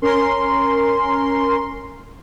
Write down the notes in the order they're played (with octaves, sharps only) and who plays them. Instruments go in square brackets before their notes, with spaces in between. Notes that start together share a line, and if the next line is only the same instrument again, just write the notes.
[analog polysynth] C#4 A#4 C6